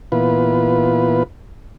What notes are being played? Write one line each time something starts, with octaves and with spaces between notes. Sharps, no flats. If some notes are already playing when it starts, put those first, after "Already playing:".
A#2 E3 B3 F4 B4